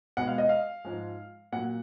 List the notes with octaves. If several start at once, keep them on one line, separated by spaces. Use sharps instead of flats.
B2 G#3 F#5
F5
D#5
F5
G#2 F3 G#3
A#2 F#3 F#5